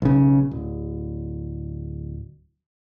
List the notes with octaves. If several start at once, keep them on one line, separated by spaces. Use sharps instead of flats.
B1 C#3
D1